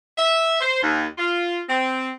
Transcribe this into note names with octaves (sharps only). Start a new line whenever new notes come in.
E5
C5
D#2
F4
C4